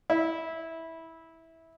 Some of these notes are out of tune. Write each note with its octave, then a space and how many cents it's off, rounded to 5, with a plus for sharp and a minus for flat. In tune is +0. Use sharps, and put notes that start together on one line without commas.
E4 -15